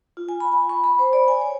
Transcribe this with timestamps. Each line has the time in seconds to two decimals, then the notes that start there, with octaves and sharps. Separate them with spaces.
0.17 F4
0.29 G#5
0.40 B5
0.53 G#5
0.69 C#6
0.84 B5
0.99 C5
1.13 D5
1.28 G#5
1.41 C#5